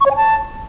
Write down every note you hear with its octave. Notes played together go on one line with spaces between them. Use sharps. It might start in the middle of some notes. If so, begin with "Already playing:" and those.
C#6
C#5
G#5
A5